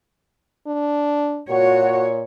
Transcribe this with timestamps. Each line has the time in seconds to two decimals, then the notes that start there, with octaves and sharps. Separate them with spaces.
0.67 D4
1.50 A#2 F#4 C#5